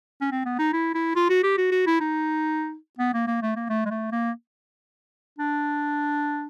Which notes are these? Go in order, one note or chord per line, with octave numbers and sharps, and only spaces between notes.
C#4
C4
B3
D#4
E4
E4
F4
F#4
G4
F#4
F#4
E4
D#4
B3
A#3
A#3
A3
A#3
A3
G#3
A3
A#3
D4